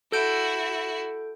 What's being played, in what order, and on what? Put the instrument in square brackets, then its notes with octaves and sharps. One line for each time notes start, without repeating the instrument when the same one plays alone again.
[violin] E4 F#4 [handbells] A4 G6 D7